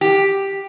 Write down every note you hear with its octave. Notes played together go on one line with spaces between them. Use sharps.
G4